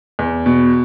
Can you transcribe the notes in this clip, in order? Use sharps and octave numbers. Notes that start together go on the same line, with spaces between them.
E2
B2